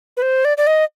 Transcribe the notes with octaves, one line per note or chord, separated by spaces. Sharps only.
B4
C5
D5
D5
D#5